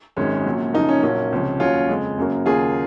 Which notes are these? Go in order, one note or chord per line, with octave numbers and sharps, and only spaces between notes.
G#1 F#2 D#3 G#3 C#4
A#1 A#2 F#3
F#2 C#3 F3 A#3 D#4
C#4
A#1 A#2 F#3 A#3 C#4
C#2 C3 F3
D#2 C#3 F#3 C#4 F4
F2 C#3 G#3
F#2 C#3 F#3 A#3
D#2 C#3 F#3 A#3 F4 G#4